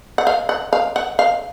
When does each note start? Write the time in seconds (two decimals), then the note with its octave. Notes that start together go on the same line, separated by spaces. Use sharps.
0.18 F#5
0.27 F5
0.49 F#5
0.73 F5
0.96 F#5
1.19 F5